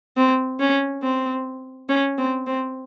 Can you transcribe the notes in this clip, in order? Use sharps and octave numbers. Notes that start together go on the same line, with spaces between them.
C4
C#4
C4
C#4
C4
C4